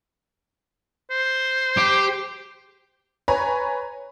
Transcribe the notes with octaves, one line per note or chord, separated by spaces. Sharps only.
C5
G4
B4 C#5 G#5 A#5